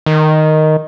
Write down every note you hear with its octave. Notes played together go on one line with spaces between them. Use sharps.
D#3